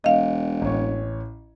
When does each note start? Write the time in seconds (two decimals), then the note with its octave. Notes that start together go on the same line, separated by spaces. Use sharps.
0.04 E1 D#5 F5
0.61 A1 C#5